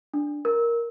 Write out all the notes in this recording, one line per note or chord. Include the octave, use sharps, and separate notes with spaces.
D4
A#4